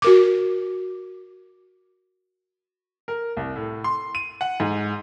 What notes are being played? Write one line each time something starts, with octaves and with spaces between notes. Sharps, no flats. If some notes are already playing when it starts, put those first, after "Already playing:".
F#4 A#4 D6
A#4
C2
A2
C6
D#7
F#5
G#2